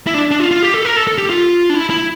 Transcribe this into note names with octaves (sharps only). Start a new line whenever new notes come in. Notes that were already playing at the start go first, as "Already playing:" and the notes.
E4
D4
D4
F4
F4
G4
A4
A#4
A4
A4
G4
F4
D4
E4
E4